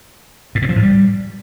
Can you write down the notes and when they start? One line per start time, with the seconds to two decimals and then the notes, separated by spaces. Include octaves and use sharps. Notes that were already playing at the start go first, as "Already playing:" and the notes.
0.55 A2
0.62 A#2
0.69 F3
0.76 A2
0.83 G3